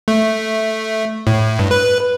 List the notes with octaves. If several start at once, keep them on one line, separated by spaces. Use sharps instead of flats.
A3
A2
G2
B4